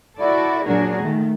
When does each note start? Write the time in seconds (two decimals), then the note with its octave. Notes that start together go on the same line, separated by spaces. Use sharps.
0.19 E4 F#4 A4 D5
0.66 A#2 F#3 D4 F#4 G#4 A#4
1.01 D#3 A3